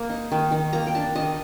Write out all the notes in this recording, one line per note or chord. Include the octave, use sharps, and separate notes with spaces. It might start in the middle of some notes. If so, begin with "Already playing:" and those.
Already playing: A#3
D#4
D#3
D#3
A#3 A#5
G5
D4 A5
D#3 D#5